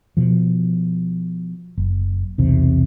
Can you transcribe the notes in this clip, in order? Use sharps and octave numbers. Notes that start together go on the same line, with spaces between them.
B2 F3
F#1
B1 E2 C3